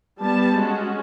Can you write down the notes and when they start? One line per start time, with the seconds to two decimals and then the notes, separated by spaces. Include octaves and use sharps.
0.19 G3 B3 A5
0.57 G#3 C#4 F#4